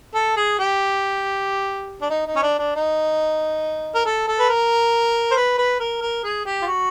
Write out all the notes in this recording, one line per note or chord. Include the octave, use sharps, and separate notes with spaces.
A4
G#4
G4
D4
D#4
D#4
C#4
D4
D4
D#4
A#4
A4
A4
B4
A#4
C5
B4
B4
A#4
A#4
G#4
G4
F4
F#4